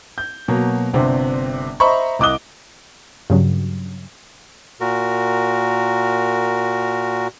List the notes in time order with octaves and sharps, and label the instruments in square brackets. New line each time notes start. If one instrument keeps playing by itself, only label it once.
[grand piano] G6
B2 F#3 A#3
G1 C3 C4 D4
C5 D#5 E5 A#5 B5 C#6
C2 D#5 D6 D#6 F#6 G7
[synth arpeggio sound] G2 C#3 F#3
[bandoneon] A#2 F#4 A#4